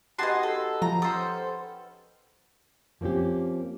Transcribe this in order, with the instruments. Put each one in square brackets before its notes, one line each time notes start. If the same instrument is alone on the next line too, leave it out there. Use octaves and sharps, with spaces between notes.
[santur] B3 D#4 G4 [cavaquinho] F#4 A5 [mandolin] D#5 G#5 C6
[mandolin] A4
[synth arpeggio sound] F3 [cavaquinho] A#5
[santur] C#4 [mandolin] A4 C5 [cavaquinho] D#6
[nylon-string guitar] F3 A#3 C4 C#4 G4